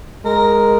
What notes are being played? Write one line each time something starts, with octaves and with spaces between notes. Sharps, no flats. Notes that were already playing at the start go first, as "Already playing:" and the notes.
G#3 A#4